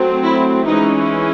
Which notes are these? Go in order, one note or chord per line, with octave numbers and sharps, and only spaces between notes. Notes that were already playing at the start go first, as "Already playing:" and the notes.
Already playing: F#3 A3 C4
E4
E3 G#3 C#4 D#4